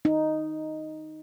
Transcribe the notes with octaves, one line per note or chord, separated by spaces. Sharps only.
D#4